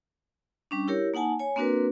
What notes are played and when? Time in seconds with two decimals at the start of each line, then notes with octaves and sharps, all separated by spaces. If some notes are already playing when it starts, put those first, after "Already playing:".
0.71 G3 C#4 D4
0.88 E4 G4 A#4 C#5
1.14 A#3 D#4 F#5 G#5 A5
1.39 C#5 G#5
1.56 A#3 C4 D4 F#4 A#4 B4